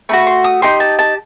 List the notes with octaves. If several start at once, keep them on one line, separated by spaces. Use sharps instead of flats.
A3 D#4 F#4 B5
C6
D#6
D#4 G4 C6
A5
A5